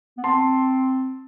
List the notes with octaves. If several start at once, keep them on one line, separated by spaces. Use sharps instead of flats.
B3
C4 A5 C6